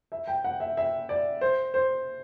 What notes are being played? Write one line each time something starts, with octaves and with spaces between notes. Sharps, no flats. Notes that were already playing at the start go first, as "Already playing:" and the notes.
E5
G5
F#5
E5
E5
D5
C5
C5